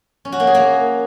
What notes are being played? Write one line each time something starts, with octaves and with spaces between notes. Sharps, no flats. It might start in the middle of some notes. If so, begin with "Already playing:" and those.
C#4
F#4
A#3
G#4
A#3